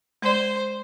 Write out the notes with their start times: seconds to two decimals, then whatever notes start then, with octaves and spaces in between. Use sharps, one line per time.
0.22 G#3 C5 D5